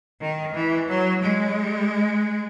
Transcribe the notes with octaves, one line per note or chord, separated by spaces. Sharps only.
D#3
E3
F#3
G#3